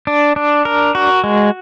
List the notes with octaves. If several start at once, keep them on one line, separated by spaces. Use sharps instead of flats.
D4
D4
A#4
F#4
G#3